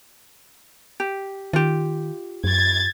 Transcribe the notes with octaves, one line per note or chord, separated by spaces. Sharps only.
G4
D#3 F4 G4
F#2 G#6 A6